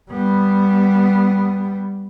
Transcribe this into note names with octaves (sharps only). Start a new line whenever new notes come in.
G3 B3